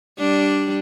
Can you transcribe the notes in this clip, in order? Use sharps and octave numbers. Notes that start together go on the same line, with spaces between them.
G3 D4